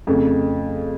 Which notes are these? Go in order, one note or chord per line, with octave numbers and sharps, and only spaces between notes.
F2 C#3 A3